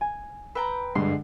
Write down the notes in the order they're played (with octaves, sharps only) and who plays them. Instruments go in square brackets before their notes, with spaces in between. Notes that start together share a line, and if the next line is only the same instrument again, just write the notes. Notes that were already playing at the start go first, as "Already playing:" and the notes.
[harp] G#5
[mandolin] B4 G5 A#5 [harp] E6
[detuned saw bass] G2 [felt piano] D3 G#3 [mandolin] C6